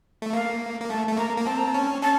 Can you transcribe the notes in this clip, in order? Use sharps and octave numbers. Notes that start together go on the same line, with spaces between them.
A3
A#3 F5
A#3
A3 A5
A3
A#3 A#5
A#3
C4 A5
A#5
A5
C#4
C#4 A5